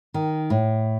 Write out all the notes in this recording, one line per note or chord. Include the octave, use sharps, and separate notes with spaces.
D#3
A2